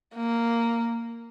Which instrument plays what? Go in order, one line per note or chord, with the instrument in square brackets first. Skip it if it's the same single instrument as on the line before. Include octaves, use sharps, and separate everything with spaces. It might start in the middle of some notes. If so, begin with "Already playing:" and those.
[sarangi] A#3